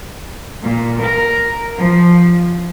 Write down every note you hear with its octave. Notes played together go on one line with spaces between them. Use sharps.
A#2
A#4
F3